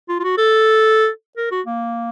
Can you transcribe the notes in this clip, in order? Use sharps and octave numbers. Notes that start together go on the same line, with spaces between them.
F4
F4
F#4
A4
A#4
F#4
A#3